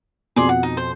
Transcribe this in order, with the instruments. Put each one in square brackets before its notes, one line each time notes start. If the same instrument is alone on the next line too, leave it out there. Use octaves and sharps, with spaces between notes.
[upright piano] F2 B2 [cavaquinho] G#4 D5 C6
[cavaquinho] F#5
D#4
C5